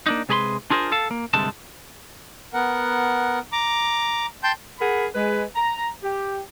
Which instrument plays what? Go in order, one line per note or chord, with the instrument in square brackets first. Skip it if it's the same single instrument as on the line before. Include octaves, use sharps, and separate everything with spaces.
[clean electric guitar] A#3 D4 D#4
C3 G#3 G#4 B4 B5 C6
D4 F4 G#4 A#4 C5
A4 F5 A5
A#3
D2 G2 C3 G#3 A3 A5
[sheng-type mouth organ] B3 A#4 F#5
A#5 D6
G5 A5 C6 G6
[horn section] G#4 A#4 F#5 B5
G#3 B4
A#5
G4